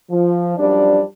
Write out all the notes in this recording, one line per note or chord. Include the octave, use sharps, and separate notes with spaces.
F3
F#2 F3 G3 D4 D5